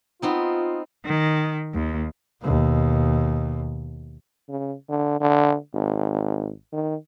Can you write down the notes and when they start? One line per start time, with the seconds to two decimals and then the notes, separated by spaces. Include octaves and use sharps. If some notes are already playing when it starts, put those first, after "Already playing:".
0.22 B3 C4 D#4 F4
1.05 D#3
1.74 D#2
2.42 D#2 B2
4.49 C#3
4.89 D3
5.21 D3
5.74 G#1
6.73 D#3